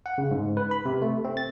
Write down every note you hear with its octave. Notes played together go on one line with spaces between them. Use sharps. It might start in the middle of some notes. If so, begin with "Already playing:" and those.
F#5
C#3
G#2
B4
B5
C3
A3
C4
A6